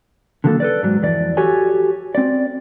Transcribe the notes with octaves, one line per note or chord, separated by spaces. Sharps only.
D3 D#3 F#3 A#3 A4
A4 B4 D5
G#2 F#3
F2 E3 D5
F#4 G4 A4 C#5 G#5
C4 D5